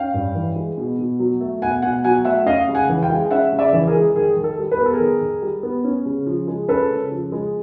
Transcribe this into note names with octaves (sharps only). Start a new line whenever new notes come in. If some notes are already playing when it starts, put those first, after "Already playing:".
Already playing: C#4 F5 G5
G2
E3
G#3
B2
B2
F#3
A3
B2 F#5 G#5
B2 F#5 G#5
F#3 F#5 G#5
A3 E5 F#5
C#4 D#5 F5
C#3
F#5 G#5
E3
F5 G5
G#3
C#4 E5 F#5
C#3
D5 E5
E3
G#4 A#4
G#3
D#3 G#4
D#3
A4
G3
B4
B3 A#4
A4
G#4 A#4
D#3
D#3
G3
B3
C#4
C#3
F3
G#3
C#4 A4 B4
C#3
F3
G#3